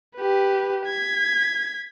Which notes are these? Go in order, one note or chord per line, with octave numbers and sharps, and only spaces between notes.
G4 B4
G#6 B6